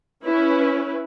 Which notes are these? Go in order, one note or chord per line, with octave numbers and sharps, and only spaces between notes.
C#4 E4 B4